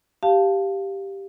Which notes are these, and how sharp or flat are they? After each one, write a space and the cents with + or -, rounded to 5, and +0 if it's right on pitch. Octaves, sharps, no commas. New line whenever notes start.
G4 +0 F5 +0 A5 +0